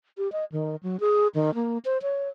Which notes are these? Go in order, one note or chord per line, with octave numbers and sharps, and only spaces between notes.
G4
D#5
D#3
F#3
G#4
D#3
A#3
C5
C#5